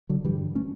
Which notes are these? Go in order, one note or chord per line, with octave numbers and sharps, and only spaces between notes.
D3 F#3
G2 D3 E3 G3
A3 C#4